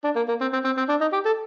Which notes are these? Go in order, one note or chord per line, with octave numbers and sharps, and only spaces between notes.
D4
A#3
A#3
C4
C4
C4
C4
D4
D#4
G4
A4